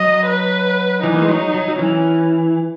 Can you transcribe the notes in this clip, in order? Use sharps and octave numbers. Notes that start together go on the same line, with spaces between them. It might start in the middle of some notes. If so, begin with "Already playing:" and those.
Already playing: F#3 D#5
B4
E3 D#4
A#3
G#3
F#3
F#3
F#3
E3 C#4